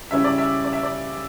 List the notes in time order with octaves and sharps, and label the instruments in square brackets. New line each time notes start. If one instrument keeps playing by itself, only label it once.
[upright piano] C#3 G3 C#4 E4 E5
D5
E5
D5
E5
D5